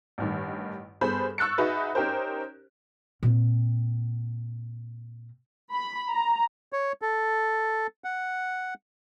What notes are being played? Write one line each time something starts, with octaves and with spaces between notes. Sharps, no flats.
A1 G2 D#3
G2 B3 G#4 A4 C5 B5
C#6 E6 F#6 A6 C#7
D#4 F#4 G#4 B4 E5
C#4 D#4 G4 A#4 C5
A#2 C4
B5
A#5
C#5
A4
F#5